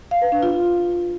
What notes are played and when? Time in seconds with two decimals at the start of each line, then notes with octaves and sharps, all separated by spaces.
0.11 F5
0.22 B4
0.32 D4
0.43 F4